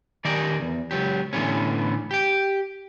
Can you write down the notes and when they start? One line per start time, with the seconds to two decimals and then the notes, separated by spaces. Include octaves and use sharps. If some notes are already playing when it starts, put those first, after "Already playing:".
0.25 D#3 G4 G#4 A#4 D5
0.61 E2
0.91 C#2 G#2 F#3 G4
1.33 A2 D3 E3 G3 B3 C#4
2.11 G4 G5